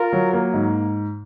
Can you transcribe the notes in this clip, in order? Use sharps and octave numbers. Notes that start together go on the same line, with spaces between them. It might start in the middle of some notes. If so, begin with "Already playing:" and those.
Already playing: F4 A#4
F#3
A#3
G#2